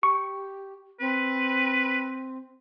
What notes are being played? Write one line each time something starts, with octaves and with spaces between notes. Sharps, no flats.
G4 C#6
C4 B4